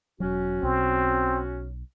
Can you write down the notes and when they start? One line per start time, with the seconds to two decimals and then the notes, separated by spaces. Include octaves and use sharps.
0.20 E1 F#3 C#4 F#4
0.63 B1 C4